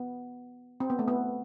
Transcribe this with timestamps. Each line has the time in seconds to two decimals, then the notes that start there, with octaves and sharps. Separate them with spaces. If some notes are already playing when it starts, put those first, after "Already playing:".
Already playing: B3
0.80 C4
0.90 B3
0.99 A3
1.08 B3